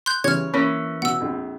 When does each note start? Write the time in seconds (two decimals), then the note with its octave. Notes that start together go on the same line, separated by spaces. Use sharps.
0.06 C6 F#6 G6
0.24 C#3 E3 G3 C#5 F6 G#6
0.54 E3 A#3 C#4 C#5 C#6
1.02 B2 F#5 E6
1.20 A#1 F2